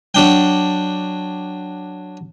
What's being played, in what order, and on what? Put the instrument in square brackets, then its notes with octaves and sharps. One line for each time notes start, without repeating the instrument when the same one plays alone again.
[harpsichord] F#3 D4 G5